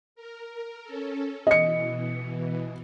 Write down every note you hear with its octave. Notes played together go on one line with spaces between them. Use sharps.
A#4
C#4 A4
B2 E3 D#5 C#7